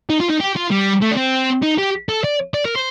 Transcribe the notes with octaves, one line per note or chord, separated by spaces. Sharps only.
D#4
F4
D#4
G4
F4
G3
A3
D4
C4
D#4
G4
A4
D5
D5
A#4
C5